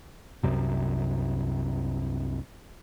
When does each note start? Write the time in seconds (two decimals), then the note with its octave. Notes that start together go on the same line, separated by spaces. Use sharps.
0.43 C2 F#2 C3